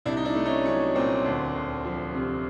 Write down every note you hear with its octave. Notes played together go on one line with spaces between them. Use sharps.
C2 D4 E4
D#4
D4 E4
A3
C#4 D#4
F#3 C#4
A#2 C4
D2
D2
F3
C3